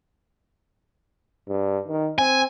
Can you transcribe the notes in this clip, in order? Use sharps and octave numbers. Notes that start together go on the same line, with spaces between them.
G2
D#3
C4 G#5